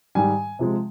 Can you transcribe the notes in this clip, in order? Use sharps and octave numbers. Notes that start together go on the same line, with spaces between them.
G#2 D#3 G3 G#5
C3 F3 G#3